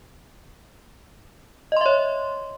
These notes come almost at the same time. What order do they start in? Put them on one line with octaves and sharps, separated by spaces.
D#5 C6 E5 C#5